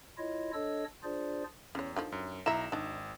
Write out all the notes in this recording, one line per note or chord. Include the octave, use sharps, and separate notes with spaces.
E4 F4 C#5 D#5
D4 A4 C#5 D#5 E6
D4 F4 G#4 C5 D5
E2 C#4 C#5
D3 D#3 F3
F#2
B1 E4 E5 A#5 E7
G#1 D4 D#4